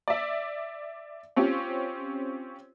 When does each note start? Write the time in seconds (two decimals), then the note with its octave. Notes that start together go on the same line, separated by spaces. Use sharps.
0.08 D5 E5
1.36 C4 C#4 F4 G4